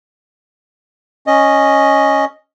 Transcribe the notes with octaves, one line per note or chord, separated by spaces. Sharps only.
C#4 D#5